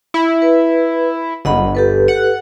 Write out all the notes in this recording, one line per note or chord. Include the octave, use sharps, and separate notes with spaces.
E4
B4
G1 D#5 F#5 B5
G4 A4 B4
F#5